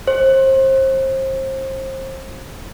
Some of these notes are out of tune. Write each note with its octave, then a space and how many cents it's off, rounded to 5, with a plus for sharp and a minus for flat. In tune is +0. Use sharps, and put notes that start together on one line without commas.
C5 +30